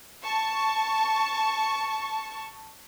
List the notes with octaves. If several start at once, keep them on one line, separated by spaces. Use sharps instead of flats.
A5 C#6